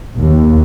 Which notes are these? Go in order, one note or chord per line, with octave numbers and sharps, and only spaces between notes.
D#2